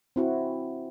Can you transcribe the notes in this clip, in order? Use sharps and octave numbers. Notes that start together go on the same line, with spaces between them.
C4 E4 F#4